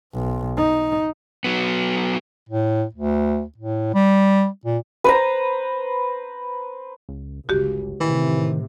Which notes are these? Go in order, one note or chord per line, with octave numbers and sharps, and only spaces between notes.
B1
D#4
F#3 B3
A2
D2
A2
G3
A#2
B4 C5 A#5
C#2
G1 C#2 F#4 G4
A2 C3 D#3 E3